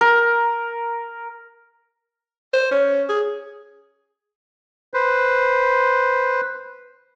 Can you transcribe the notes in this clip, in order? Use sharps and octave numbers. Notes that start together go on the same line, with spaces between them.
A#4
C5
C#4
G#4
B4 C5